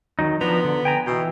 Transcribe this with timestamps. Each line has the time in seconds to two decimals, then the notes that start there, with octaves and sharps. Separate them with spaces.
0.19 D#3 F#3 D#4
0.41 F3 B3 D4 A#5
0.64 D3
0.85 G5 G#5 A#5
1.07 B2 E3 G5